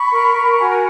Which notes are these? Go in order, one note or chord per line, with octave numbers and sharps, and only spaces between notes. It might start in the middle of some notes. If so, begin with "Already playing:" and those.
Already playing: B5 C#6
A#4
A#4
F#4 F#5 G#5